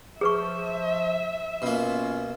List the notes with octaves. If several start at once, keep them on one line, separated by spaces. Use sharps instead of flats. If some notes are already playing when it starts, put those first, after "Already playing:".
F3 G#4 B4 E5 C#6
B2 A#3 C#4 F4